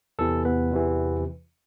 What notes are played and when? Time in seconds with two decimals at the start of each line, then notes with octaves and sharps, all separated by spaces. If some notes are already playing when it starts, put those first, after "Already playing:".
0.19 E2 C3 E3 A4
0.45 B3 B4
0.71 E2 C3 E3